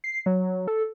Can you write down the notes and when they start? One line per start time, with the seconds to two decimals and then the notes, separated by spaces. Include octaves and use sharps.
0.04 C7
0.26 F#3
0.67 A4